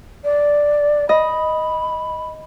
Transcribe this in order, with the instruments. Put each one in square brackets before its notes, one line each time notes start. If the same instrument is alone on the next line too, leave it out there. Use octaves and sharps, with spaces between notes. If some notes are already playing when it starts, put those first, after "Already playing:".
[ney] D5
[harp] D#5 [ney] B5